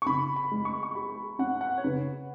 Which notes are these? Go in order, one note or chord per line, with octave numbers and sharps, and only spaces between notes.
C#6
C#3 B5
B5
G#3
C#6
C#6
G#4 B5
C#4 F#5
F#5
C#5
C#3 B4